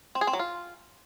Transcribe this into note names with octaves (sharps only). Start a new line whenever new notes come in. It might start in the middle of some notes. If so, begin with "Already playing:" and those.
C4
G#4
C4
F#3
F4